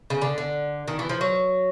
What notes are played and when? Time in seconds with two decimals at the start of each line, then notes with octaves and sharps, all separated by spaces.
0.10 C#3
0.22 D3
0.38 D3
0.88 D#3
0.99 E3
1.09 F3
1.21 F#3